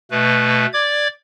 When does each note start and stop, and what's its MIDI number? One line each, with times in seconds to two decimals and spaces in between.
0.11 0.66 47
0.11 0.66 57
0.11 0.66 71
0.73 1.07 74
0.73 1.07 86
0.73 1.07 92